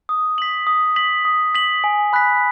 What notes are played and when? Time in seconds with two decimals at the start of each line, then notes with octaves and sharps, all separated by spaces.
0.09 D#6
0.38 B6 F#7
0.67 D#6
0.96 B6 F#7
1.25 D#6
1.55 B6 F#7
1.84 G#5
2.13 B5 F#6 B6